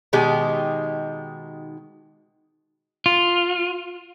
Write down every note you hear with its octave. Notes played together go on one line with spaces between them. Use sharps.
B2 D#3 G#3 D#4 G4
F4